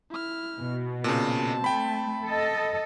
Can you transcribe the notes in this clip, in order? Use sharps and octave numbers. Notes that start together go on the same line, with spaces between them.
E4 F6
B2
A#2 C#3 C4 A5
A3 G5 B5
A4 D#5